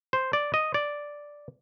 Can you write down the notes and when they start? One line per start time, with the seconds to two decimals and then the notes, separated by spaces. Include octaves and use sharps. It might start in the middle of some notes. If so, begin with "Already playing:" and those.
0.13 C5
0.33 D5
0.54 D#5
0.74 D5